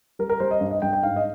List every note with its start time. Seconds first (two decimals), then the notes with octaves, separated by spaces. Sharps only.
0.19 G3 A#4
0.29 A#4
0.40 G3 C5
0.51 D#5
0.61 G2
0.71 D#5
0.82 G2 G5
0.93 G5
1.03 G#2 F5
1.16 D#5